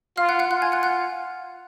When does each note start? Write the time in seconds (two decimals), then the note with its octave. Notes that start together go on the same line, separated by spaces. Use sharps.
0.17 F4 F5 F6
0.29 F#5 F#6
0.39 F#5 F#6
0.50 F4 F#5 F#6
0.62 G#5 G#6
0.72 F#5 F#6
0.83 F#5 F#6